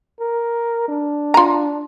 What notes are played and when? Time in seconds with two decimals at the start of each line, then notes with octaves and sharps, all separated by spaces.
0.20 A#4
0.89 D4
1.34 F4 A#5